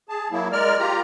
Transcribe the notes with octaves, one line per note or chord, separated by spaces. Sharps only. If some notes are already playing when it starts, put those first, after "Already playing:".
G#4 A5
F#3 A#3 E4
G#3 A#4 D5 F6
F4 G4 A#5